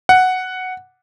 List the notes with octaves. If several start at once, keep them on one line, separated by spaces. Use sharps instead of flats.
F#5